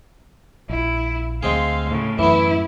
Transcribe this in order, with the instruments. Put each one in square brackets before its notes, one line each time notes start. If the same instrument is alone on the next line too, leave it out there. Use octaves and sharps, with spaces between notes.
[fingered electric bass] A#1 [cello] E4
[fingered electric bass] D2 [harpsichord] G#3 C4 G#4 [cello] F5
[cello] A2 C#3
[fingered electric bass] F#2 A2 [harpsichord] E3 B3 [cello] E4